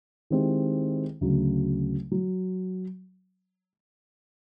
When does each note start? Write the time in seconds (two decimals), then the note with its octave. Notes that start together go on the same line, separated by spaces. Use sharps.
0.30 D#3 G#3 C4 E4 G4
1.21 D2 C#3 F#3
2.12 F#3